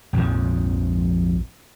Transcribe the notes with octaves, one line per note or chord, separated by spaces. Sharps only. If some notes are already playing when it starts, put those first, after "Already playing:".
A#1 F2 G#2 F3